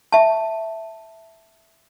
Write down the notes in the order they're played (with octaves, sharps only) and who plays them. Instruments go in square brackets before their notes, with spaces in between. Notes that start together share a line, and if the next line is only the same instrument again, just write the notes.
[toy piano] E5 A5